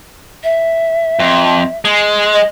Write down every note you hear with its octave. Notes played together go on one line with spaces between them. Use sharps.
E5
F2
G#3
D#5